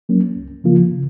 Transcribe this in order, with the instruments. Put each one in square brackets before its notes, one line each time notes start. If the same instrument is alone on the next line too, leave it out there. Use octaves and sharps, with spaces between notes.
[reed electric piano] F#3 A#3 C#4
C#2
C#3 F3 A#3 F4
C#3